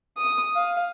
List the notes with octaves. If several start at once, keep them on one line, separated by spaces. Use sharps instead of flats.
D#6
F5